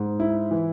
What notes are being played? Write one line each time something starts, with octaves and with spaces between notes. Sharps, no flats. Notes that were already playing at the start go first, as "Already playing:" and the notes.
Already playing: G#2
E4
E3